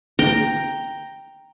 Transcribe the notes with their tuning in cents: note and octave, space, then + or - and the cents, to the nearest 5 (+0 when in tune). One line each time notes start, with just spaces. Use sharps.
G5 +0 A#5 +0